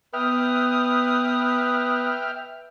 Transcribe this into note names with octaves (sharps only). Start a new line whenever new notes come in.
B3 B4 E5 G5 D#6 F6